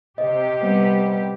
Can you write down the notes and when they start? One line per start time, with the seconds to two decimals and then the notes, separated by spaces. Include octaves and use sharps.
0.18 C3 G4 D#5
0.59 G3 B3